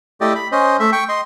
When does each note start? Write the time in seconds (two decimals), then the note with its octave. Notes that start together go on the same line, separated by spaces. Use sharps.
0.21 A3 E4 G4 D5 D#5
0.35 B5
0.52 C#4 C5 D#5
0.80 A3 E5
0.92 G5 C#6
1.09 D#5 C6